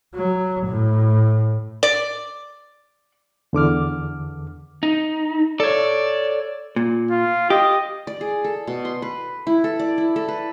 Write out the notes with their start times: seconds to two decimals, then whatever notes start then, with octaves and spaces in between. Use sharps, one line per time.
0.15 F#3
0.68 A2
1.83 D5
3.53 E2 D3 D6 F6
4.83 D#4
5.60 A4 C#5 D5
6.76 A#2
7.11 F4
7.50 G4 D#5
8.07 D5
8.21 G#4
8.44 A4
8.67 B2
8.85 C6
9.02 B4
9.47 E4
9.64 A4
9.79 D5
9.98 E4
10.16 A4
10.28 B4